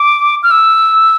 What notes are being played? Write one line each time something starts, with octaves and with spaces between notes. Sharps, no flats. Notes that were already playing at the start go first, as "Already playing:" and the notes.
Already playing: D6
F6
E6